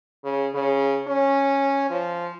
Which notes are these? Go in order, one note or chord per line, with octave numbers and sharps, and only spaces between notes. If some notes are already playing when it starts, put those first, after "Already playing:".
C#3
C#3
C#4
F3